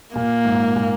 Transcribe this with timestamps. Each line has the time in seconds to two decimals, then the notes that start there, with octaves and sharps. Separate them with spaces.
0.15 A#2 A#3
0.45 G#2
0.76 A#2